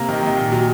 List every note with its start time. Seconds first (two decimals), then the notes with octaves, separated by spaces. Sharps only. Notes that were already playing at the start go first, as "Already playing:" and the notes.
Already playing: C3 A#3 A#5
0.08 D#3
0.23 D#3
0.37 A#2
0.52 F#3